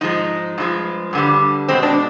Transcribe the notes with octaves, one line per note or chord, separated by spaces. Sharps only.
G#2 F3 G#3 D#4
G2 F3 G#3
G2 D3 G3
B2 G#3 C4
D4